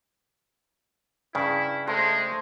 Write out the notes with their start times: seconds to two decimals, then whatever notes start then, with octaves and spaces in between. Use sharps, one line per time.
1.35 G2 C#3 E4
1.87 G#3 A3 C5